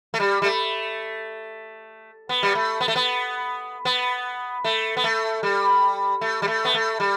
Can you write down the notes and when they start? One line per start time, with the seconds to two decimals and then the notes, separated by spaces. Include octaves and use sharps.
0.14 A3
0.20 G3
0.42 G3
0.45 A3
2.29 B3
2.43 G3
2.55 A3
2.81 B3
2.88 A3
2.96 B3
3.85 B3
4.65 A3
4.97 B3
5.04 A3
5.43 G3
6.21 A3
6.42 G3
6.48 A3
6.65 B3
6.74 A3
7.00 G3